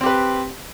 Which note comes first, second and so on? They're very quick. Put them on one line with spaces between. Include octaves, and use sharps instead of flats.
C4 G4 B4